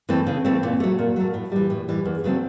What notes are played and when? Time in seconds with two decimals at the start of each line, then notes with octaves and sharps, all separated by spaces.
0.09 E3 A3 C4
0.27 C#3
0.45 E3 A3 C4
0.63 A#2
0.80 F#3 A3
0.99 A#2
1.16 F#3 A3
1.34 A2
1.52 E3 G3
1.70 A2
1.89 E3 G3
2.05 E2
2.24 C#3 F#3 A3 C4